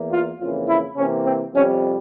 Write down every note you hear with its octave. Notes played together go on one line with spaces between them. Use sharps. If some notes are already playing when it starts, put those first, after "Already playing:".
Already playing: E2 E3 A#3
F4
F2 C#3 E3 A#3 F4
E4
C3 E3 A#3 C#4
C4
F2 C3 G3 C#4